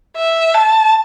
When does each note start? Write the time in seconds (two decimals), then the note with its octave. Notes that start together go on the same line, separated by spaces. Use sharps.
0.17 E5
0.54 A5